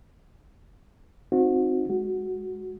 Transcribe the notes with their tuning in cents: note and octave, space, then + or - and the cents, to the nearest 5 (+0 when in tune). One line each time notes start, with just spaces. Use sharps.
C4 +5 D#4 +0 F#4 -30
G#3 +0 F#4 +0